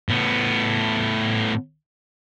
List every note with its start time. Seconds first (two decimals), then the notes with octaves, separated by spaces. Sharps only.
0.09 A2 B3